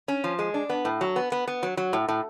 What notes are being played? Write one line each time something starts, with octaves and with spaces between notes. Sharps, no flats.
C#4
F3
G#3
D4
B3
A2
F#3
B3
B3
B3
F#3
F#3
A2
A2